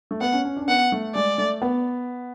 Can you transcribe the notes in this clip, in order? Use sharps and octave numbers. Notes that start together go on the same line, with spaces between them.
A3
B3 F#5
C#4
C#4
D4
C#4
B3 F#5
A3
G#3 D5
A3
B3